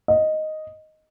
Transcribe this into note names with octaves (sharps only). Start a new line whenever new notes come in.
D#5